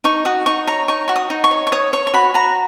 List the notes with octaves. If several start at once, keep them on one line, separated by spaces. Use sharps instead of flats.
D#4 C#6
F#4 D#6
D#4 C#6
C#5 A#5
D#4 C#6
F#4 C#6
D#6
D#4
C#6
C#5
C#6
C#5 D#6
C#5 C#6
C#6
F#4 B5
F#4 A#5